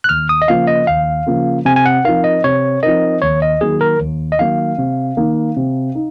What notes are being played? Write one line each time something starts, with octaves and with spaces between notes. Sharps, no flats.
F#6
D#2 F6
D#6
D#5
C#3 F3 A#3 F4 F5
D#5
D#2 F5
C#3 F3 A#3 F4
C3 G#5
G#5
F#5
F3 C4 D#4 A#4 F5
D#5
C3 C#5
F3 C4 D#4 A#4 D#5
D#2 C#5
D#5
D#3 F#3 A#3 G#4
A#4
D#2
D#5
D#3 F#3 A#3 F5
C3
D#3 A#3 D#4
C3
D#4